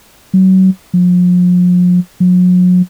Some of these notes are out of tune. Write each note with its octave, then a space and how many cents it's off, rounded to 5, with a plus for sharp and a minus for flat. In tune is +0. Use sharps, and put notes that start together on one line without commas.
F#3 +30
F3 +40
F#3 -40